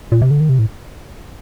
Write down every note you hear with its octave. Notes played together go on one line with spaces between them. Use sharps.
A#2
C3
D3
D#3
C3
A2